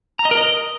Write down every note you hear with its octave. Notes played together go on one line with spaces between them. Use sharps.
A#5
D#5
A#4
D#5